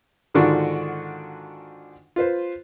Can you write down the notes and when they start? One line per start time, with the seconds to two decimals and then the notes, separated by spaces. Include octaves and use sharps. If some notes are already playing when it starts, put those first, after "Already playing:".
0.34 G#2 D3 D#3 D4 F4 F#4
2.16 F4 B4 C5